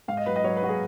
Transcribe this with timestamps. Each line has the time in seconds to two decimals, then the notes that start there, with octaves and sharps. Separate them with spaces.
0.08 G#2 F5
0.17 D#5
0.26 F#3 B4
0.36 D#5
0.44 F#3 C#5
0.56 B4
0.63 F#3 F#4
0.69 G#4